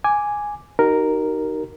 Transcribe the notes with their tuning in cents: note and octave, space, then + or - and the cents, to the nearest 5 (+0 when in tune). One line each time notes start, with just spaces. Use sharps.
G#5 +0 D6 +0
D#4 -5 F#4 +45 A#4 -5